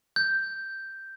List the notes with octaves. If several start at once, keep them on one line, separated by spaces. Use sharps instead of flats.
G6